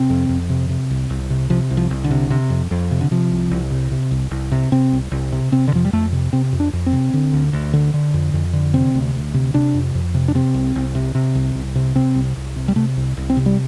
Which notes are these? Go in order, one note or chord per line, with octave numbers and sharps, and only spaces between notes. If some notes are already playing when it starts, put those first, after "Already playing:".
Already playing: C3 C4
F2
F2
C3
C3
C2
C2
C3
C3 F3
C2
F3
C2
D3
C3
C3
F2
F2
C3
D3
C3 F3
C2
C2
C3
C3
C2
C2
C3
C3 C4
C2
C2
C3
C3 C4
D3
F2 F3
G3
F2 A3
C3
C3 C4
F2
D4
F2
C4
C3
D3
D2
D2
D3
D3
F2
F2
D3
C3 C4
D2
D2
C3
C3 D4
F2
F2
C3
D4
C3 C4
C2
C2
C3
C3
C2
C2
C3
C3 C4
C2
C2
C3
G3
C3 A3
C2
C2
C4
C3
G3